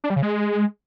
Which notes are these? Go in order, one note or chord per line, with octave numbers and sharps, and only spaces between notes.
D4
G3
C#3
G#3